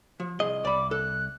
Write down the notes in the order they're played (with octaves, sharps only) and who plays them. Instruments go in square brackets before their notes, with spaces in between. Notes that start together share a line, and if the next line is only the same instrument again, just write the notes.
[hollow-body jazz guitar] F3
[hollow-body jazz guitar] C2 G#4 [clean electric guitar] D#5
[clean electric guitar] C2 [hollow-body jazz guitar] D5 B5 [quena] D6
[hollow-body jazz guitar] A4 [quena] F#6